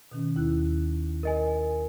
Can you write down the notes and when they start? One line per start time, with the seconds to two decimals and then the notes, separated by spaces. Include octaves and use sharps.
0.12 B2 D#3 C#4
0.36 D#2 E4 F#6
1.23 A#4 D#5 G#5